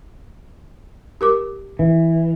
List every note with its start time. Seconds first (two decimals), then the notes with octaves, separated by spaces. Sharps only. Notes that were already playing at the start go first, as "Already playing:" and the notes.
1.21 G4 A#4 D6
1.79 E3